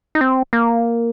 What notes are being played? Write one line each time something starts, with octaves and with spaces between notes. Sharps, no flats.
D#4
C4
A#3